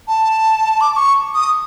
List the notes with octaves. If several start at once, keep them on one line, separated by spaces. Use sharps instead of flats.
A5
D6
D6
C#6
D#6